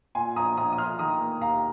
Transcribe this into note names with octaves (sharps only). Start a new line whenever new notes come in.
A#2 G#5 C6
A#1 A#5 D#6
A#1 A#5 D#6
D#6
A#2 C6 F6
D#3 A#5 D#6
A#3
D#2 F5 A#5